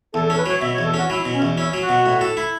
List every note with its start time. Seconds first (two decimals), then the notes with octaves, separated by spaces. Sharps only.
0.14 E2 A4
0.27 A4
0.30 C#4
0.38 B4
0.46 F#3 C#5
0.62 B2 E5
0.74 C#5
0.78 E2
0.86 A4
0.94 C#4 F#4
1.10 F#3 E4
1.26 B2
1.34 C#4
1.42 E2
1.58 C#4 E4
1.73 F#3
1.82 F#4
1.89 B2
2.06 A2
2.21 A4
2.37 E4